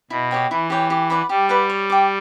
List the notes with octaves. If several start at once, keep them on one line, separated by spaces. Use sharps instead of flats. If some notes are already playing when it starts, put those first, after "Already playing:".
B2 E4
G4 C#5 G5
E3 E4
G4 C#5 G5
G4
B4 D5 F#5
G3 G4
B4 D5 F#5
C#5
G5 D6